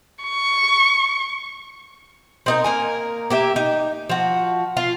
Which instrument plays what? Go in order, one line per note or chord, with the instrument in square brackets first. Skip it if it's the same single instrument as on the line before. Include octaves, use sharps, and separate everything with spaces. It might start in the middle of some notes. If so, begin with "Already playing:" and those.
[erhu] C#6
[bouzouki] C4 D#4 A#4
A#3 A#4 G#5
A#3 G4 E5
D#4
F3 F#4
F4